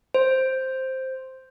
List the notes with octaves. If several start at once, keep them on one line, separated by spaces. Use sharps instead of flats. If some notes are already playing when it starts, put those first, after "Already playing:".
C5